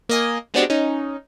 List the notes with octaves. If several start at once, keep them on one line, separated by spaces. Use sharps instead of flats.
A#3 D#5 G#5
G#3 B3 C4 D4 F#4 G4
C#4 D#4